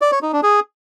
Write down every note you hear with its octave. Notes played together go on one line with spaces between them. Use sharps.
D5
C#5
D#4
D4
G#4